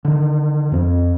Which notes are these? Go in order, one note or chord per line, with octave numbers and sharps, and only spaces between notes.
D3 D#3
F2 C4